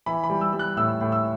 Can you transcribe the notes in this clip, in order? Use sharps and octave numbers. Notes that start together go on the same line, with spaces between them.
E3 B5
B5
G3
E6
G3
F#6
A2 E6
A2
E6